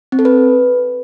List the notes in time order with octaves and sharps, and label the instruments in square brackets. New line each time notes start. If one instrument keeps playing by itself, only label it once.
[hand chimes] C4
A4
B4